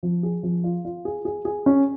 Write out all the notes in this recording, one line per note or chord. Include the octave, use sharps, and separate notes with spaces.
F3
G#4
F3
F4
F4
G#4
G#4
G#4
C#4